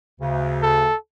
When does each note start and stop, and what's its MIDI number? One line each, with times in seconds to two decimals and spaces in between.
0.21 0.88 38
0.21 0.88 49
0.62 0.96 69